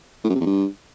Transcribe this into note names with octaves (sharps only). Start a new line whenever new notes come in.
A2
F#2
C3
E2
G2